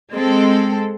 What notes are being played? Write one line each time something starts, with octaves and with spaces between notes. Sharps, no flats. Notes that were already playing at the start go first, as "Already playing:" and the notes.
G#3 C4 A4